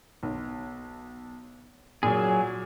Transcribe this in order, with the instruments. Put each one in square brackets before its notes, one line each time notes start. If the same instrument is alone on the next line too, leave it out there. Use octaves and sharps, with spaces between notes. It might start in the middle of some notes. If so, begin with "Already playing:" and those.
[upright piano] B1
[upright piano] A#2 [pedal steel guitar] F#3 G#4